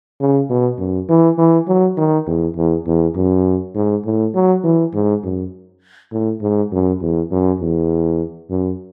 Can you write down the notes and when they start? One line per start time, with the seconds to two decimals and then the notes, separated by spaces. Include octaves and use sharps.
0.20 C#3
0.49 B2
0.79 F#2
1.09 E3
1.38 E3
1.68 F#3
1.97 D#3
2.27 E2
2.56 E2
2.86 E2
3.16 F#2
3.75 G#2
4.05 A2
4.34 F#3
4.64 E3
4.94 G#2
5.23 F#2
6.12 A2
6.42 G#2
6.72 F#2
7.01 E2
7.31 F#2
7.60 E2
8.50 F#2